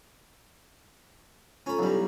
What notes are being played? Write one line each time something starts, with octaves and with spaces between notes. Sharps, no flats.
C#4 F4 A4 A#5 B5
B1 G3 E4 G4